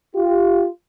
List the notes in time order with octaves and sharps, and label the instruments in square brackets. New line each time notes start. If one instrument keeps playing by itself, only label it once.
[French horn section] F4 G4